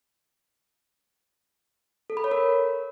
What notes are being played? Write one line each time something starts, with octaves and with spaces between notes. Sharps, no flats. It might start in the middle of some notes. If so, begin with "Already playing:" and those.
A4
B5
C#5
A#4